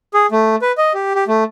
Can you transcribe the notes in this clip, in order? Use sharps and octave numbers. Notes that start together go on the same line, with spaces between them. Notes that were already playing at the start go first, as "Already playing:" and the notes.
G#4
A3
B4
D#5
G4
G4
A3